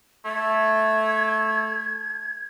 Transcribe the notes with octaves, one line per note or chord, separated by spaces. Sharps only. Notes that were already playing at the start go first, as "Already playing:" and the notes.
A3 G#6